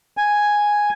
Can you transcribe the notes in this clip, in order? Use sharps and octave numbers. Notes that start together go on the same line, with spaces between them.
G#5